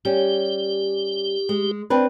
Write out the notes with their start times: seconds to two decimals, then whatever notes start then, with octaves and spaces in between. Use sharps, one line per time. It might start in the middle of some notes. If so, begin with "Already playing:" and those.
0.05 G3 C#4 G4
1.49 G#3
1.90 C4 D4 B4